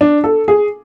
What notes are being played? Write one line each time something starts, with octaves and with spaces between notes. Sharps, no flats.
D4
A4
G#4